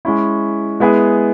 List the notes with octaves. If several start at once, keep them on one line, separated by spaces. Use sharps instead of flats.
G#3 C#4 E4
G#3 B3 E4 G#4